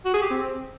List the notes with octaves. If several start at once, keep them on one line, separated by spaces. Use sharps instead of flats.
F#4
G#4
G4
C4